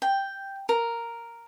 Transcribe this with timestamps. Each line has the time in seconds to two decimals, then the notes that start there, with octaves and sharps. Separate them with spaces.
0.02 G5
0.69 A#4